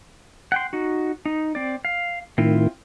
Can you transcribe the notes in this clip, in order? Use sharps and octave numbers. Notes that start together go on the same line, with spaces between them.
F#5 G5 C6
D#4 F#4
D#4
C4 D5
F5
A2 D#3 C4 E4 F4